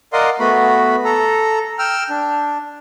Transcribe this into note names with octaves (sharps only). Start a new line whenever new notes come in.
A#4 D5 D#5 F5 F#5 C6
A3 B3 F#4 B5
A4 A#5
G5 E6 F6
D4